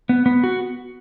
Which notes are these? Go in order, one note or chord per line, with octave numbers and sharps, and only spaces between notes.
B3
B3
F#4